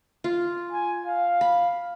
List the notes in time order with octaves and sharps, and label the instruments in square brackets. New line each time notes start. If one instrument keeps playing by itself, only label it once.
[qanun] F4
[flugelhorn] G#5
F5
[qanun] B5